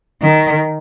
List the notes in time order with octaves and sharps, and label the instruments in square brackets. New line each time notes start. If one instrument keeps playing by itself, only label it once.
[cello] D#3